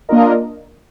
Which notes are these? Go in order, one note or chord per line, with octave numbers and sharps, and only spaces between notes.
A#3 D4 F4 A#4 D#5